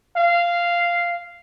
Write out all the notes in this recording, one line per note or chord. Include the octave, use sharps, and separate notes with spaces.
F5